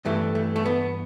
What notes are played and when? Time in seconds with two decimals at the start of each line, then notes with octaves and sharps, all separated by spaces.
0.05 G2 E3 A3
0.35 A3
0.56 A3
0.66 B3